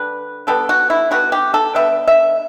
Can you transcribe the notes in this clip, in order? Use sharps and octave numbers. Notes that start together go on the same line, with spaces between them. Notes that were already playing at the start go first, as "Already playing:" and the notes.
Already playing: D3 G3 B4
D3 G3 B3 A4
F#4
E4
D3 G3 B3 F#4
G4
A4
D3 G3 B3 E5
E5